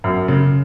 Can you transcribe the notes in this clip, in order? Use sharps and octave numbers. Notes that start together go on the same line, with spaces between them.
F#2
C#3